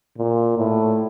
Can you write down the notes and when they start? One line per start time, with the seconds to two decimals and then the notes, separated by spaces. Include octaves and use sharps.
0.17 A#2
0.57 A2